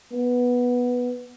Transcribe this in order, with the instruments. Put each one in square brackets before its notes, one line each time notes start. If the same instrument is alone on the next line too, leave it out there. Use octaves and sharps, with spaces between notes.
[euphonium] B3